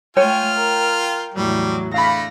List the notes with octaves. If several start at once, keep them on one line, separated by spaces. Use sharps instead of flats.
A3 F4 C#5 G5 G#5 F6
A#4
E2 A2 F#3 G3
D3 A3 F5 B5 A#6